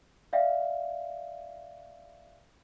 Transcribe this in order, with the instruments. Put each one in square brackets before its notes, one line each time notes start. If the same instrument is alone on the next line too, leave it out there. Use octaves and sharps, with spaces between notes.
[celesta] D5 E5 F5 G5